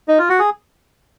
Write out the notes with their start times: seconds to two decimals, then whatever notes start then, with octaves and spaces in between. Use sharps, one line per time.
0.08 D#4
0.18 F4
0.29 F#4
0.39 G#4